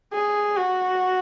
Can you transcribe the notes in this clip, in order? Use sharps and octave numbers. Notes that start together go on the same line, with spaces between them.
G#4
F#4